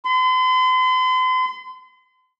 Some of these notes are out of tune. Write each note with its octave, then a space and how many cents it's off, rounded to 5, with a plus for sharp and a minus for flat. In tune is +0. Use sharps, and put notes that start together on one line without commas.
C6 -40